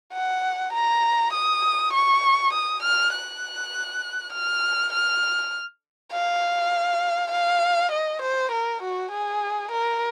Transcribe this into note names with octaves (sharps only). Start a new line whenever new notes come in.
F#5
A#5
D#6
C#6
D#6
F6
F#6
F6
F6
F5
F5
D#5
C5
A#4
F#4
G#4
A#4